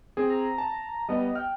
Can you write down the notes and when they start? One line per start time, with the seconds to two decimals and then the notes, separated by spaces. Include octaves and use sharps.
0.17 C4 G#4
0.30 A#5
0.58 A5
1.09 G3 B3 D#5
1.35 G5 F6